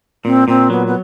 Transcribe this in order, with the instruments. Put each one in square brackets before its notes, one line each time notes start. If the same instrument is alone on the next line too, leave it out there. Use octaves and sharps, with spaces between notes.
[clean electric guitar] A#2 [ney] C4
[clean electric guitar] A#2 [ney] C4
[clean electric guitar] F#3 [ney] B3
[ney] B3